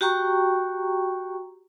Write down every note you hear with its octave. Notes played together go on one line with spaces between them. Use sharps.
F#4 G4 G5 A#5 C#6